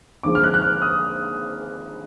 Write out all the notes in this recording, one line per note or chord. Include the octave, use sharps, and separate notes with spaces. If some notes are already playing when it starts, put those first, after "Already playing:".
D#2 D3 F3 G#3 D6
F6
F#6
F#6
F6
D#6